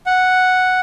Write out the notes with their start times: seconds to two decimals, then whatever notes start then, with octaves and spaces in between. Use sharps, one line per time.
0.06 F#5